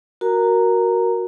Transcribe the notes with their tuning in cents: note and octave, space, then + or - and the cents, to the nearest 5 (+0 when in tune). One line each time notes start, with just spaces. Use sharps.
F#4 -5 A#4 +0 A#5 -10